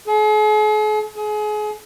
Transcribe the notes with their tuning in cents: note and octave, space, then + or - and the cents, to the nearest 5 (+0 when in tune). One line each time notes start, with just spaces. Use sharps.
G#4 +45
G#4 +30